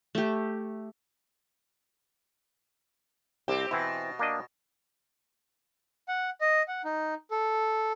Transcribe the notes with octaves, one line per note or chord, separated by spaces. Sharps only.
A3 G4
C2 C4 G4
B2 E3 C4 E4
A#3 D4 D#5
F#5
D#5
F#5
D#4
A4